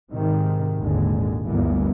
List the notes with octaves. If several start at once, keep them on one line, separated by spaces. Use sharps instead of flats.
G#2 C3 D#3
G#1 D#2 A#2 D3 G#3
G1 D2 E3 A#3 B3